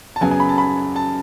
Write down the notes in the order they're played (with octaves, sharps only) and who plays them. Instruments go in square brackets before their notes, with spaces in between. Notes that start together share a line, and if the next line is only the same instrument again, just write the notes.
[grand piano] A5
F#2 C#3 F#3 B3 G#5
G#5
B5
A5
B5
A5